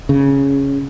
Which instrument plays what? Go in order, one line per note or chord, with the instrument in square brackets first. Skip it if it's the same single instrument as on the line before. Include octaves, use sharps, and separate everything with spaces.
[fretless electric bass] C#3